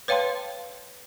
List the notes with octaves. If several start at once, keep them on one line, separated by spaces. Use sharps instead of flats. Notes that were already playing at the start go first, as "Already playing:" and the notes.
B4 C#5 F5 G5 A5 C6